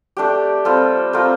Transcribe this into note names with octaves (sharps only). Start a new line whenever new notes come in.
A3 D4 G4
G3 C4 F4 A4
A3 C4 F4 A#4